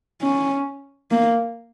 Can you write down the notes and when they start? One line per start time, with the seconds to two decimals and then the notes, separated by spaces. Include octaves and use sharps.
0.22 C#4
1.11 A#3